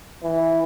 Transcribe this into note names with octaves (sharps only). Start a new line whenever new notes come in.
E3